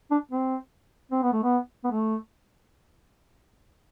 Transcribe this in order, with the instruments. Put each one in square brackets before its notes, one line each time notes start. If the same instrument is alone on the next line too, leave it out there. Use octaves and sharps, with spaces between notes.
[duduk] D4
C4
C4
B3
A3
B3
B3
A3